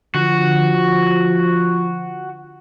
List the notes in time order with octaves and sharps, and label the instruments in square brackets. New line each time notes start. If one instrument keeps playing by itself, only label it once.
[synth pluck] D3 [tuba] F3 [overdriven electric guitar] F#4